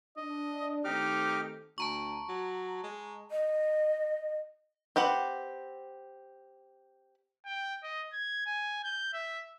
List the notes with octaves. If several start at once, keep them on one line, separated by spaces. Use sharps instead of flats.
D4 D#5
D#3 A3 C4 D#4 G4 D6 F6
D2 A5 A#5 C#6
F#3
G#3
D#5
C4 G4 B4 F#5
G5
D#5
G#6
G#5
G6
E5